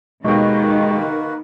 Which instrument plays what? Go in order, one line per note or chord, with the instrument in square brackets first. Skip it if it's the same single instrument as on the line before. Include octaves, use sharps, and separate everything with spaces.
[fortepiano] D#2 B2 [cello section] D#3 [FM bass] G#3 [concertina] A#3 F#4 B4